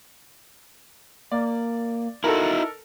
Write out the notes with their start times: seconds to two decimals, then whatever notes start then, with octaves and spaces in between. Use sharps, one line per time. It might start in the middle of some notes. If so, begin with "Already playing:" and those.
1.32 A#3 D5
2.24 D#4 E4 F#4 A4 A#4